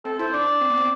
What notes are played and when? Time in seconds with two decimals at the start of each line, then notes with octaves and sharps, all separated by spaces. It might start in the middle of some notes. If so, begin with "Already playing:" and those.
0.05 C4 A4
0.19 E4 C5
0.33 D4 D5
0.47 D4
0.61 C4
0.70 B3
0.78 C4